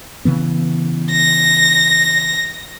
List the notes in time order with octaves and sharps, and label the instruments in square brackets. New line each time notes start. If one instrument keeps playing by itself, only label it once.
[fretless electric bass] C#3 E3 B3
[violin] A#6